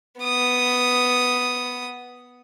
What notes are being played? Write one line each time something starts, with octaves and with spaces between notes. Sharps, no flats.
B3 D#6